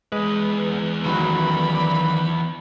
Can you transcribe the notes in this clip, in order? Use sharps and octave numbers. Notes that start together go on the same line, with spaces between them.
E2 G#3 B4
D#3 F#3 B5
D5